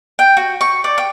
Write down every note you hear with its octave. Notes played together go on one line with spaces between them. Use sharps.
G5
F#4
C#6
D5
G5